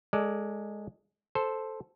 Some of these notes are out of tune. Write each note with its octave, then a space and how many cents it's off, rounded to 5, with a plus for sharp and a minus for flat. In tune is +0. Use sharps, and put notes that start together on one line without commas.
G#3 +0 A4 +20 D5 +0
A4 -5 C5 +0